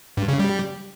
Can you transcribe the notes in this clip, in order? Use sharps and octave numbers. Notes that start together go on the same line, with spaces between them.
G2
C#3
G3